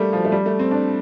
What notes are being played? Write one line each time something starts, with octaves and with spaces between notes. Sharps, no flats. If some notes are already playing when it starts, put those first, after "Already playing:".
Already playing: G3 A3 A#3
F3
A3
G3
A3
C4
D4